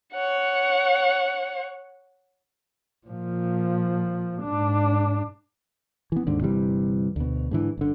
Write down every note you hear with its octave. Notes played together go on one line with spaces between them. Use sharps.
C#5 F#5
A#2 F3
G#2 D4
E3 B3
D#2 G#2 D3
G1 C3 E3 G3
D2 B2
G#2 D3 E3
G1 D3